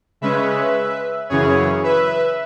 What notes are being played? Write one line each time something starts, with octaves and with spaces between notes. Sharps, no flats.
C#3 G#3 C#4 B4 E5
F#2 C#3 E3 C#4 G#4 C#5
B4 E5